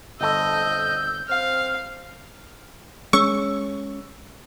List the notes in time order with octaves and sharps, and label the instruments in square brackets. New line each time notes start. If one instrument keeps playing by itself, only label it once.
[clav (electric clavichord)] G1 A4 [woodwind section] F2 E6 [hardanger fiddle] D#5 [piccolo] G6
[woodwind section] C4 F6 [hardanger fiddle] F5
[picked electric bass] G#3 C#4 [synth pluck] C#6 [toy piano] E6